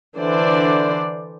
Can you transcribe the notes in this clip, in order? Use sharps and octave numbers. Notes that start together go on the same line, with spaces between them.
D3 E3 D4 C5 D5